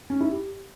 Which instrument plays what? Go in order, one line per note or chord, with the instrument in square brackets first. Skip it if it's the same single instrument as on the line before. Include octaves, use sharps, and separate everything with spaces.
[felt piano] C#4
E4
G4